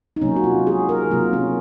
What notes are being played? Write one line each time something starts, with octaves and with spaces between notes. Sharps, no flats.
D#4
C3 F#3 A#3 C#4
F#4
F4
G#4
A#4
C3 F#3 A#3 F4
C#4